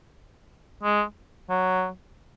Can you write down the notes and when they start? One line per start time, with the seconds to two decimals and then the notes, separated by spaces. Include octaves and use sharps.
0.83 G#3
1.49 F#3